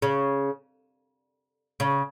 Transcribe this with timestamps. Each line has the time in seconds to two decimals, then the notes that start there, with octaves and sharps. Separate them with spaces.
0.02 C#3
1.80 C#3